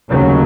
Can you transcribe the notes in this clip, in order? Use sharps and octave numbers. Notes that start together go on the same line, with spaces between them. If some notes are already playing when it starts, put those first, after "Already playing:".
F1 D#2 C#3 F#3